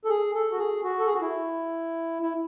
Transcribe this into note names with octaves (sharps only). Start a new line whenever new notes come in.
A4
G#4
A4
F#4
G#4
F#4
A4
G#4
F#4
E4
E4